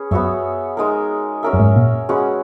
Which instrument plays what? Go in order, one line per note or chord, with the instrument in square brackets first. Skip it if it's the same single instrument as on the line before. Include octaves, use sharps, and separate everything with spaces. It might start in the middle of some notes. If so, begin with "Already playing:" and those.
Already playing: [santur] C#4 G#4 B4
[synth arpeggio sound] F#2 [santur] B3 F#4 C#5 E5
[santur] G#3 D#4 A#4
C#4 F#4 A#4 E5
[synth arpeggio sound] F#2
G#2
A#2
[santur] G#3 C#4 F#4 B4